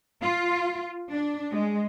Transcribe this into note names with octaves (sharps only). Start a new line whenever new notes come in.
F4
D4
G#3